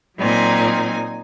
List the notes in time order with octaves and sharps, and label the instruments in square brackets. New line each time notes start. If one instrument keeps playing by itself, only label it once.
[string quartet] A#2 F#3 C4 D#4 G#5